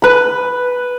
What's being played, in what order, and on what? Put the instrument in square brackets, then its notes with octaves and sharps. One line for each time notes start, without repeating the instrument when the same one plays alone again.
[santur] B4 B5